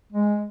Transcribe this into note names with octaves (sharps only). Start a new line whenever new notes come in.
G#3